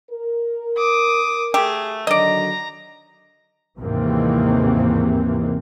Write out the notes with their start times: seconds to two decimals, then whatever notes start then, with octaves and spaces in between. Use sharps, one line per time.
0.11 A#4
0.77 D6 D#6
1.54 A3 G4 G#4
2.07 D3 D#3 F#3 D5 D#5 A#5
3.78 D#2 G#2 C3 E3 A#3 C4